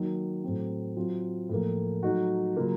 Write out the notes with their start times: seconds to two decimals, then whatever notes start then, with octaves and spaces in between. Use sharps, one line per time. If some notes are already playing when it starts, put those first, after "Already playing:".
Already playing: D#3 F#3 A#3
0.44 A2 F#3 C4
0.96 F#3 C4 F4
1.49 A2 F3 A#3
2.03 F#3 A3 D#4 F#4
2.56 C#3 F#3 A#3 F4